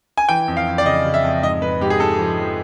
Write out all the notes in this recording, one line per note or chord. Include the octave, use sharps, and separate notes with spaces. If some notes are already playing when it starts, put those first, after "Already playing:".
G#5
E3 G5
F2
F5
F2
D5
C#3 D#5
C#3
E5
F2
G#2 D#5
G#2 B4
G#2 G4
G#4
G#2 A4
F3
F3